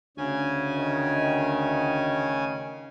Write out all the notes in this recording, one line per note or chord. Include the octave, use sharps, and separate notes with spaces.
D2 C#3 C#4 G#5
D#3